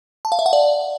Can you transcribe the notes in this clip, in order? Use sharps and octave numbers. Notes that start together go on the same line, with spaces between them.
A5
F5
E5
F#5
D5